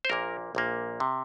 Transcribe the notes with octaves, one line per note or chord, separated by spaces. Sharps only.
C5
A#1 A#2 A#3 A#4
A#1 A#2 A#3
C3